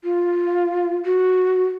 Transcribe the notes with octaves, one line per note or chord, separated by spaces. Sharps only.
F4
F#4